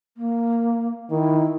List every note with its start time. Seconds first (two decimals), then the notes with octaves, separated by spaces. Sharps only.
0.17 A#3
1.11 D#3 E4